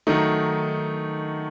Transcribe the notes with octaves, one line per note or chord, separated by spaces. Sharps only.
D#3 F#3 A3 D#4